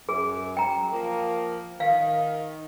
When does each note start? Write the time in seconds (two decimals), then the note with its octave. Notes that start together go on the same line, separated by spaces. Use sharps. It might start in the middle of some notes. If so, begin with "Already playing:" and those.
0.09 F#2 G#4
0.57 G5 A#5
0.92 F3 A#3
1.80 D#3 F5